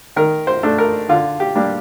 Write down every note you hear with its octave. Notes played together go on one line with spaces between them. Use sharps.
D#3 A#4
C5
A3 D4
A#4
D3 F4
G4
G3 A#3 D4